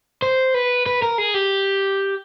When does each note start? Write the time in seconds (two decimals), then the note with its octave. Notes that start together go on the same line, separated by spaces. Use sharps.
0.22 C5
0.54 B4
0.86 B4
1.02 A#4
1.18 G#4
1.34 G4